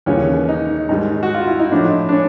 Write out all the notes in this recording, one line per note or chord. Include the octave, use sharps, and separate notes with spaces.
D#2 C#3 E3 G3 C#4
D#4
G#2 D#3 G3 D#4
F#4
F4
E4
D#4
A2 F3 D4
D4
C#4